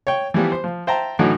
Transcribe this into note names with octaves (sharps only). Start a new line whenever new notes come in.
C#5 G5
E3 F3 G3 B3
C5
F3
C5 E5 G5 A5 A#5
A2 D3 E3 F#3 D#4 F#4